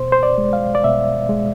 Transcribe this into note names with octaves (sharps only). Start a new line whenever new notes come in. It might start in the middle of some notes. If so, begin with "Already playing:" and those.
Already playing: B2 C5
C5
D5
G#3
F5
D5
B2 E5
G#3